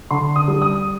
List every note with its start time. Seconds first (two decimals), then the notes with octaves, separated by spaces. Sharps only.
0.11 D3 C6
0.36 D#6
0.48 G3
0.62 D#6